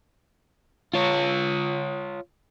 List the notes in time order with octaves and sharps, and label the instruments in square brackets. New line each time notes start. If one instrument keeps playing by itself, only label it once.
[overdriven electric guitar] F4 C#5